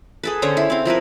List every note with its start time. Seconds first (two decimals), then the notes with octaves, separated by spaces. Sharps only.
0.23 G#4 A4 B4
0.42 D3 C#4 C5 C#5
0.57 E4
0.70 C4 F5
0.85 F3 E4 A#4 B4